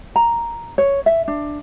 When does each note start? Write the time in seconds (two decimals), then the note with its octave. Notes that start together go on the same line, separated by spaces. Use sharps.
0.16 A#5
0.78 C#5
1.06 E5
1.28 D4